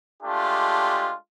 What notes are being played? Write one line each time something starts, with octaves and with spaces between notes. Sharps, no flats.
G#3 A3 D4 F4 G4